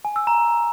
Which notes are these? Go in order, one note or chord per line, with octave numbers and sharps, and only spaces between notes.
G#5
E6
A#5